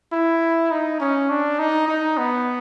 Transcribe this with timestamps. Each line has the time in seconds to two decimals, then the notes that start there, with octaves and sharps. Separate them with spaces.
0.13 E4
0.71 D#4
1.00 C#4
1.29 D4
1.59 D#4
1.88 D#4
2.17 B3